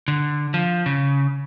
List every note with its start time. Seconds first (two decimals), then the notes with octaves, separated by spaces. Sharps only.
0.08 D3
0.54 F3
0.86 C#3